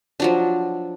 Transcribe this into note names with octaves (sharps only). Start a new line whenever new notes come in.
F3 F#3 D4